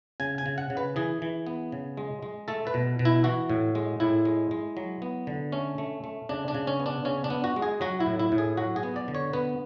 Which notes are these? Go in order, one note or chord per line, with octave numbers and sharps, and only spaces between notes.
C#3 G#5
G#5
C#3
F#5
C#3
B4
E3 G#4
E3
B3
C#3
G#3
G#3
A3 A4
B4
B2
B2
E4
E3 F#4
A2
G#3
A2 E4
G#3
G#3
F#3
B3
D3
A3 C#4
A3
A3
C#3 D4
D4
C#3
C#4
B3
D4
C#3 C#4
D4
B3
F#4
G#3
G#4
F#3 F#4
E4
A2
E4
A2
G#4
F#3 F#4
G#4
B3
D5
D3
C#5
B3 B4